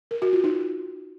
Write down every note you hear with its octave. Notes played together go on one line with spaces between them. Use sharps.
A#4
F#4
F4
D#4